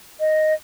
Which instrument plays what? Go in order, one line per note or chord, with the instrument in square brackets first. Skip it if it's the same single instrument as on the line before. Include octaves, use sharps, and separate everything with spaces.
[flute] D#5